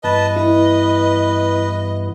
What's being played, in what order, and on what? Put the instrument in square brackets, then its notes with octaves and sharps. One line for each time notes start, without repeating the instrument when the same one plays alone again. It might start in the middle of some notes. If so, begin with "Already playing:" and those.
[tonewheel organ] G2 E3 B3 [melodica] B4 A5 [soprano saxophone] D#5
[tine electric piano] E4 [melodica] B4